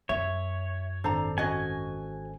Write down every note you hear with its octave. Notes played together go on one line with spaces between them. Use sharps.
F#2 C#5 E5
G#1 D4 A4 C5 A#5
C#4 F#4 D#5 G#5